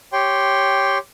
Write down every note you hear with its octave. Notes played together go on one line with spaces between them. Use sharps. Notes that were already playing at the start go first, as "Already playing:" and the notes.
G4 C#5 G5 C6